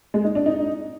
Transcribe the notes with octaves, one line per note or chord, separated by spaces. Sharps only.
G#3
D#4
D4
D#4